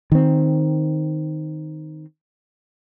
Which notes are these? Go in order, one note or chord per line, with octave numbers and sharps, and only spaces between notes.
D#3 C4